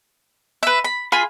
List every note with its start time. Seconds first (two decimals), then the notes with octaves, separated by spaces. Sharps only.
0.63 B4 E5
0.84 B5
1.12 F4 G#4 B5